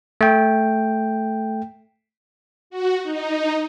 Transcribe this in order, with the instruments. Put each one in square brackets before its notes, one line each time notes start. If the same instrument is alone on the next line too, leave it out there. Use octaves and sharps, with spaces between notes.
[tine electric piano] A3 G5
[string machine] F#4
D#4